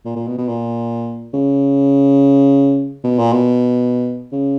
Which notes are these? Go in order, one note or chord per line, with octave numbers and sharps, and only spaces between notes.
A#2
A#2
B2
B2
A#2
C#3
B2
A#2
B2
C#3